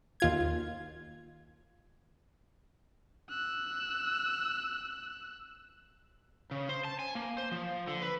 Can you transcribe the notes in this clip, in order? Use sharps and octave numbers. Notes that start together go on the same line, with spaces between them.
D#2 F4 G#6
E6 F#6
C#3
C5
A5
G#5
A#3
C5
F3
D3
B4